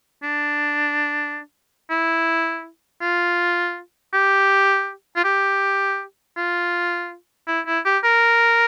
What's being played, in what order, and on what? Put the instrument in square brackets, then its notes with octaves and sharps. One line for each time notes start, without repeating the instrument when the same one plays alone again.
[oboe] D4
E4
F4
G4
F4
G4
F4
E4
E4
G4
A#4